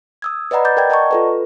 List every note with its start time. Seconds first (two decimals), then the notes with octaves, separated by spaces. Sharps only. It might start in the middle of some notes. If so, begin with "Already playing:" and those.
0.22 D#6 E6 G#6
0.51 B4 D5 D#5 F#5 A#5 B5
0.65 D6 G6 A6
0.77 A#4 D5 G5 G#6
0.90 D5 D#5 F#5 A5 A#5 C#6
1.11 F4 A4 B4